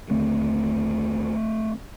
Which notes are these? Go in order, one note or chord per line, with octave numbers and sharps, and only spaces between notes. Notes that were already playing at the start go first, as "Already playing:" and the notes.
D#2 D3 A3 C4